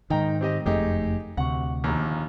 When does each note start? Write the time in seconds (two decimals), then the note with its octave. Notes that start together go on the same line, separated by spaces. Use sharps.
0.10 G#2 D#3 D#4 G5 A#5
0.41 C4 G4 D#5
0.66 F#1 F2 A3 D#4 G4 G#4
1.37 D2 C3 F#5 C#6
1.84 A#1 D#2